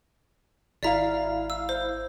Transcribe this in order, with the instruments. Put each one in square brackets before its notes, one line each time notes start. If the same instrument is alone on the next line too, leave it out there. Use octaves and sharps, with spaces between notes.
[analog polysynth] G#1 E4 F5 [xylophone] D5 E5 A#5
[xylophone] E6
C5